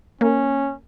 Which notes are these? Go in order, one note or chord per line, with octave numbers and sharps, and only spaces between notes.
A#3 C#4 A#4